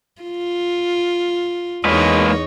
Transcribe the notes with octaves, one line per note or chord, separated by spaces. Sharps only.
F4
E2 G#3 A#3 D#4 B4 C#5